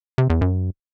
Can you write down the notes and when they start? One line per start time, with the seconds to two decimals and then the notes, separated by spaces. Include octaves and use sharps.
0.18 C3
0.30 E2
0.41 F#2